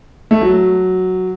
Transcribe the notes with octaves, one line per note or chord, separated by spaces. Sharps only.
A3
F#3